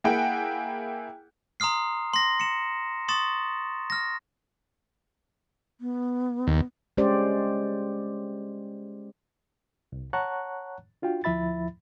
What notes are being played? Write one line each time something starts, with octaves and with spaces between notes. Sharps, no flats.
A#3 E4 G#4 F#5 G5
A#5 C6 D#6 F6 C7
C6 A#6
C#7 E7
C6 C#6 D#6 A6 E7
F6 A#6
B3
D#2
G#3 C#4 G4 C5 D5
C2
C#5 F#5 A5 A#5 C#6 F#6
D4 F4 F#4 G5
D2 F3 E4 E5 B5 A6